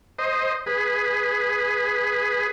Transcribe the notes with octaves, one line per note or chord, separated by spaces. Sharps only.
C5 D#5
G#4 B4